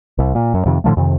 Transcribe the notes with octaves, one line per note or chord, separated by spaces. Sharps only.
C2
A#2
F#2
F2 C3 D#3
A2 D3 F3 A3
F2 C3 D#3